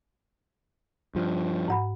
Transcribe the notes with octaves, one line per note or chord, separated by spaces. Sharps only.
G2 F3
G#2 F#5 B5